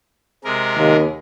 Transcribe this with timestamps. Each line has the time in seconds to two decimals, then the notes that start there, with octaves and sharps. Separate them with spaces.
0.44 C3 G#3 A#4
0.77 D#2